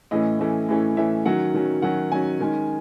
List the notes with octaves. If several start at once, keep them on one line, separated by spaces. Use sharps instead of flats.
A2 E3 A3 C#4 D#5
A2 E3 A3 C#4
A2 E3 A3 C#4
A2 E3 A3 C#4 E5
D#3 F#3 C#4 F#5
D#3 F#3 C#4
D#3 F#3 C#4 F#5
D#3 F#3 C#4 G#5
D#3 G#3 C#4